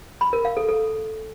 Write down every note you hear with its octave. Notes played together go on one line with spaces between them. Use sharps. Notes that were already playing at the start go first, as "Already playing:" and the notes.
B5
A#4
F5
A4
A4